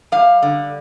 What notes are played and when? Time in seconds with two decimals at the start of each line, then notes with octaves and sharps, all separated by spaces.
0.12 G3 F5
0.43 D3